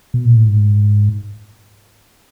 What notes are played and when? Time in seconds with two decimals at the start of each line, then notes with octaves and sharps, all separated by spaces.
0.14 B2
0.25 A#2
0.37 A2
0.48 G#2